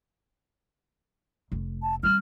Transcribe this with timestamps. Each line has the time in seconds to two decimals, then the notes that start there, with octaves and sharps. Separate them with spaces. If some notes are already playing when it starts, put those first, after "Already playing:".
1.52 F1
1.83 A5
2.03 G3 C4 F6